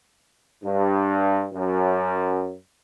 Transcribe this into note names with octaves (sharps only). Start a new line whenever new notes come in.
G2
F#2